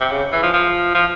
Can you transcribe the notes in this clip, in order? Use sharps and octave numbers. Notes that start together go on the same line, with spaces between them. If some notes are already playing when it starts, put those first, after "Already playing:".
C3
C#3
E3
F3
F3
F3